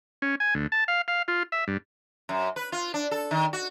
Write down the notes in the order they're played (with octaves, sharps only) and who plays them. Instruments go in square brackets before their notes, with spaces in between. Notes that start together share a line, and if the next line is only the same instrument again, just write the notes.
[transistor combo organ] C#4
G#5
D2
A5
F5
F5
F4
E5
G2
[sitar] F#2
B4
F4
D4
A4
D#3
F#4